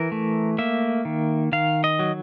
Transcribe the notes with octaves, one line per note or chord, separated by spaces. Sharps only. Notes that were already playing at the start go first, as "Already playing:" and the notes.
Already playing: E3 A#4
A3
A#3 E5
D#3
D#3 F5
D#5
F#3